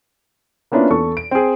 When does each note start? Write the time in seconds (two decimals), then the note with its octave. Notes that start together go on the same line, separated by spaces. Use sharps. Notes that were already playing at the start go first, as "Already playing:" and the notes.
0.72 A#3 B3 C#4 D4 E4 F4
0.90 E2 A4 C#6
1.17 D7
1.31 C4 G#4